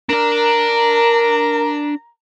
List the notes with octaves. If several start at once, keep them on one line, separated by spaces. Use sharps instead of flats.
D4 A#4 D5 A#5